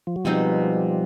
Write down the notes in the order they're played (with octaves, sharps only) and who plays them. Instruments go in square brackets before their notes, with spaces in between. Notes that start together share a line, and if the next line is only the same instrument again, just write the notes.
[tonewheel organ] F3
F#3
[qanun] B2 G#3 C4 D#4 [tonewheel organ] F3 G3